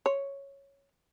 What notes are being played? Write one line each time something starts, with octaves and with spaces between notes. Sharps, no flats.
C#5